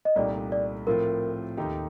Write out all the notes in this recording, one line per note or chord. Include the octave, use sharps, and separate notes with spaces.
D#5
C2 A#2 A3 D#4 G4 D5
D5
A2 F3 C4 F4 A#4
D#2 D#3 A3 D#4 G4